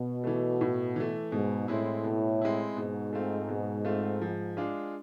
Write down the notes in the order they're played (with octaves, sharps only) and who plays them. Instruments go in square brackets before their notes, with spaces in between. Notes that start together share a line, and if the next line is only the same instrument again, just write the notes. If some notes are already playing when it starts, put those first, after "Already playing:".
Already playing: [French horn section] B2
[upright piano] E3 A3
A2
E3 A3
[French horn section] G#2 [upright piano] B2
[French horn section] A2 [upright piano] G#3 C4 E4
[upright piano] B2
G#3 C4 E4
[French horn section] G#2 [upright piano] B2
[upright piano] A3 C4 F4
B2
A3 C4 F4
F3
G#3 D4 F4